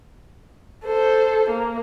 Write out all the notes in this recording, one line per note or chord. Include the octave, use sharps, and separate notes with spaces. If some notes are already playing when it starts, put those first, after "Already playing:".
A4 C5
A#3